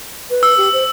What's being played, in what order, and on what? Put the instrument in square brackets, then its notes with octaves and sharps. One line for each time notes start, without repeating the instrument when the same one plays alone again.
[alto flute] B4
[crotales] E6
[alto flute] G4
C5